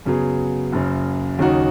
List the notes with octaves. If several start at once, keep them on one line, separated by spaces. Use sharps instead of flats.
F#2 C#3 F#3 B3 G#4
F#1 F#2 C#3
D#2 C#3 F#3 D#4 F#4